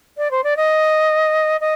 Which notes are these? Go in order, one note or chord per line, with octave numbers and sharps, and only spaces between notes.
D5
C5
D5
D#5
D#5